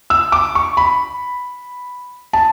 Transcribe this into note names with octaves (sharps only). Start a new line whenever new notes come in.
E6
D6
C#6
B5
A5